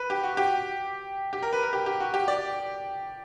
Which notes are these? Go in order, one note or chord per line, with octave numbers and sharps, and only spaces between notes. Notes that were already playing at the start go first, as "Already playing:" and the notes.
Already playing: B4
G4
F#4
G4
G4
A#4
B4
A#4
G4
G4
F#4
G4
D5